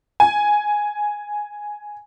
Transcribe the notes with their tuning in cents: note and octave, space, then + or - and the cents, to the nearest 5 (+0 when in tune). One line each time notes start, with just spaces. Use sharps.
G#5 +0